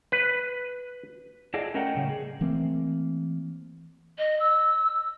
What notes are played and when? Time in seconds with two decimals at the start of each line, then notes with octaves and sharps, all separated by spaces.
0.12 B4
1.54 E4 G#4 A4 D5 D#5 F5
1.74 A3 C#4 A#4 D#5 F#5 G5
1.95 A2 C#3 G3
2.09 G#4
2.41 E3 A3 A#3 C4
4.18 D#5
4.40 E6